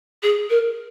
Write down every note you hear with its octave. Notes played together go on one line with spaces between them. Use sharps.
G#4
A#4